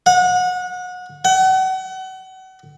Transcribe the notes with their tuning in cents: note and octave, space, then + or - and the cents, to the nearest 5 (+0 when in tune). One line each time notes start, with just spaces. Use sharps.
F#5 -30
F#5 +35